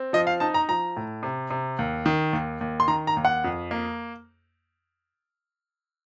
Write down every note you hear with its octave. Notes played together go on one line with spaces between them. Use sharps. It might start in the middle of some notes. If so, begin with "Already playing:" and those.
Already playing: C4
F3 D#5
F5
D#4 A5
A#5
F3 A#5
A2
C3
C3
D#2
D#3
D#2
D#2
C6
D#3 A#5
A#5
D#2
F#5
F2
A#3